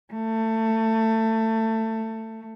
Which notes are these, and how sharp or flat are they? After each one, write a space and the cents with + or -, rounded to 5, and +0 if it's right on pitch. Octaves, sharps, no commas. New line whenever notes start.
A3 +20